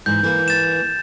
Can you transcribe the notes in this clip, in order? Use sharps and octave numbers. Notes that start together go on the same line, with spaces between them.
G#2 E3 G6
E3 A#3
A6 E7